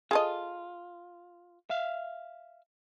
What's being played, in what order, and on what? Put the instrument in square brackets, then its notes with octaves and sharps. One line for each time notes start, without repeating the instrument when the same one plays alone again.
[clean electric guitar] F4 [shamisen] G#4 A4 D#5
[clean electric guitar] E5 F5